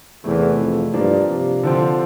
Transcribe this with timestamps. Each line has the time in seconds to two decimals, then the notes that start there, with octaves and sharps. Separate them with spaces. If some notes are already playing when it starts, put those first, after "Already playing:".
0.24 E2 C3 E3 A3 E4
0.59 F2
0.94 G2 F3 A#3 D4
1.29 C3
1.63 D3 F3 C4